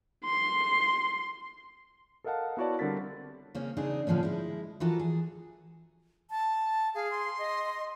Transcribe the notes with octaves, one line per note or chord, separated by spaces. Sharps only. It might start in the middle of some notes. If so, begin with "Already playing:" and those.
C6
A4 A#4 D#5 F5 F#5 A5
B3 E4 F#4 C#5 D5 A5
D3 G3 C4 A#4 A6 B6
C#3 A#3 C4 C#4
C#3 C4 D4 D#4 G#4
A2 D3 F3 A#3 C#4
G#3 E4
E3 F3 F4 F#4 A4 A#4
G#4
A5
G#4 F5
C6
D#5